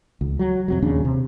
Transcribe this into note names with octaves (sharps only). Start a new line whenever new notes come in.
C#2
F#3
F2 C3 F#3
D#1 D#2 C#3 D4
C3